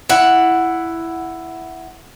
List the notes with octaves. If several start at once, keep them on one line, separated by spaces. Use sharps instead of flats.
E4 F#5